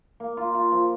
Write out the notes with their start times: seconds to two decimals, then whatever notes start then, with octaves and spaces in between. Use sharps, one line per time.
0.20 A#3
0.37 F4
0.55 F4
0.72 F3